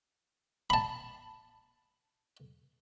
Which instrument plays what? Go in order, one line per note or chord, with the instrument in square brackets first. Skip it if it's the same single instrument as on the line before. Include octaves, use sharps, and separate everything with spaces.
[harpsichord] A5 B5